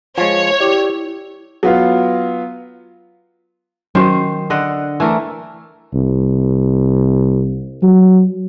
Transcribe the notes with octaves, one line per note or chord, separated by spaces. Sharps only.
F3 G#3 C#5
E4 G4 D5
F#3 B3 F4
D#3 F#3 C#4 F#4 C5
D3 D#5 F#5
E3 A3 A#4
C2
F#3